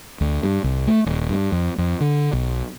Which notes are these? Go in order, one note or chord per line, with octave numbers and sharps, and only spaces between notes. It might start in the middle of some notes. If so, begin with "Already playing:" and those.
D2
G2
C2
A3
D#1
G2
F2
F2
D3
B1